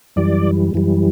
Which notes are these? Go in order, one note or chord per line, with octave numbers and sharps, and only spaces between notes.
F#2 E3 G3 D5
F#2 E3 G3